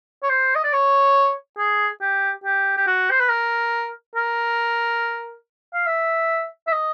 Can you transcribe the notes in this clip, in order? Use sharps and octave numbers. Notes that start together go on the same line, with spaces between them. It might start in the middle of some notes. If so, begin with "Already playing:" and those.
C#5
C5
D#5
D5
C#5
G#4
G4
G4
G4
F#4
C5
B4
A#4
A#4
F5
E5
E5
D#5